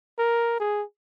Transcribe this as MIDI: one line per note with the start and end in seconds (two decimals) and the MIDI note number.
0.19 0.58 70
0.60 0.83 68